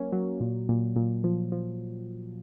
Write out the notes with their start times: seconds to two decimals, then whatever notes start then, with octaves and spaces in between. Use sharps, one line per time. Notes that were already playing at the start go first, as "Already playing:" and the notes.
Already playing: F#3 A#3 C#4
0.13 F#3
0.40 A#2
0.69 A#2
0.96 A#2
1.24 F3
1.52 F3